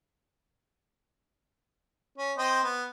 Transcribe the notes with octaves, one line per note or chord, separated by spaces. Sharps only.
C#4
C4 C5 D#5
B3